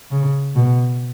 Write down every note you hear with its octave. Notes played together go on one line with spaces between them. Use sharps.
C#3
B2